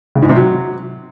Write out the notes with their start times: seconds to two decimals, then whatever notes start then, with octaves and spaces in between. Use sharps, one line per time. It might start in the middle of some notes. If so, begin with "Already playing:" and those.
0.15 C#3
0.22 G#2
0.29 C3
0.36 F#3